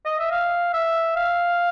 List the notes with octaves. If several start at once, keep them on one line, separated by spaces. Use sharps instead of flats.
D#5
E5
F5
E5
F5